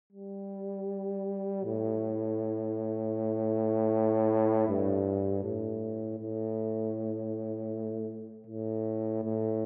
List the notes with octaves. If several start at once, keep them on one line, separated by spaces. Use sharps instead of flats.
G3
A2
G2
A2
A2
A2
A2